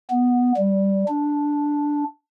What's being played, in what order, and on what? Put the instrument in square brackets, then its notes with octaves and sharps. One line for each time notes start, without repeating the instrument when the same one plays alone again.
[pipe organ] B3
G3
D4